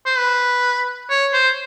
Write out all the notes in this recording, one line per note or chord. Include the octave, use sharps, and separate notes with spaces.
C5
B4
C#5
C5